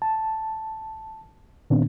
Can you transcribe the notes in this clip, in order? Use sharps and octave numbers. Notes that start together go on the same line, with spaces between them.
A5
A#2 D#3 B3 C4 D4